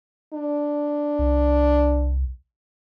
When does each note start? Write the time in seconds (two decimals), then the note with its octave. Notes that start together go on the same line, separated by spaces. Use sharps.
0.33 D4
1.19 C2